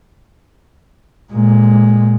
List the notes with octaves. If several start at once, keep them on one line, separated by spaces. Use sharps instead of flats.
A#2 G#3